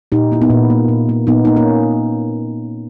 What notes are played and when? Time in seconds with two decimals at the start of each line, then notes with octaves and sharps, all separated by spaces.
0.12 A#2 D#4 G4
0.32 A#3 E4
0.42 B3 D#4
0.50 A#2
0.70 A#3
0.89 A#2
1.09 A#3
1.27 A#2 B3 D#4
1.45 A#3 D#4
1.56 A#3 C#4